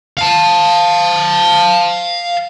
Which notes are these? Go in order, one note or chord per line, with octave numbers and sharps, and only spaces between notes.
F5 A5